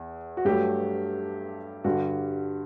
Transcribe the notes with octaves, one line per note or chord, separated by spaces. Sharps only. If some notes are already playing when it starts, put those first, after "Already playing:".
Already playing: E2
F#4
G2 F#3 A3 G4
G2 D3 G3 F#4